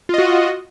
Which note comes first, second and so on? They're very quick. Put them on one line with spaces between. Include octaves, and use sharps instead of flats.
F4 D#5 F#4